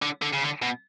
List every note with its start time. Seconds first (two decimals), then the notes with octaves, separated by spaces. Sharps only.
0.02 D3
0.22 D3
0.33 C#3
0.42 D3
0.62 B2